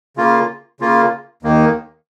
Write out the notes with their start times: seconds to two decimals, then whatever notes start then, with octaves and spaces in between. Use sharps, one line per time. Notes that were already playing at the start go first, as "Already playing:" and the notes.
0.17 C#3 A#3 F4
0.80 C#3 A#3 F4
1.43 D#2 D#3 A#3